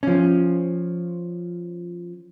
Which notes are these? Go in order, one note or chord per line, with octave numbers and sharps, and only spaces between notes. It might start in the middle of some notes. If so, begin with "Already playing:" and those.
F3 C#4